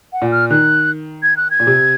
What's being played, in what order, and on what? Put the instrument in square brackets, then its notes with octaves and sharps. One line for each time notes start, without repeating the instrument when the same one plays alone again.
[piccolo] F#5
[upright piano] A#2
[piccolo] F6
[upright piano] D#3 [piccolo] F#6
[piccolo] G#6
F#6
G#6
[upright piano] A#2
C3